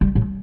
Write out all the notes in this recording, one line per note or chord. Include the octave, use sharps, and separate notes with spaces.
G3
A2